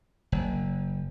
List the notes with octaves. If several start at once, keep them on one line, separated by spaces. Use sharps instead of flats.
F#1